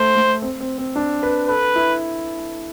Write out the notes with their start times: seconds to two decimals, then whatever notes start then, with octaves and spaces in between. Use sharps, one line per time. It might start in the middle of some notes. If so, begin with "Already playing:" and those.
Already playing: A3 C5
0.16 A3
0.42 C4
0.60 C4
0.78 C4
0.96 D4
1.23 B4
1.48 A4 B4
1.76 E4